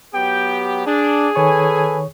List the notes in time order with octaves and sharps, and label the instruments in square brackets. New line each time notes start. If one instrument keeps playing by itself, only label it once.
[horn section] F#3 B3 G4 [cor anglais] G5
[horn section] D4 [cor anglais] G#4
[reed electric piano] D#3 C#5 C#6 [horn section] A4 B4 G#5